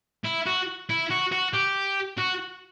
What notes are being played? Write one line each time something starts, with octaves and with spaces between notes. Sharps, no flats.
E4
F#4
E4
F#4
F#4
G4
F#4